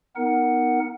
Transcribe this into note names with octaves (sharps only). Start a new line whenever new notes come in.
B3 D#4 A#4 F#5